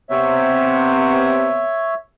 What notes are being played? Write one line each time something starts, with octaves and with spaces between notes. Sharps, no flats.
C3 B3 C#5 E5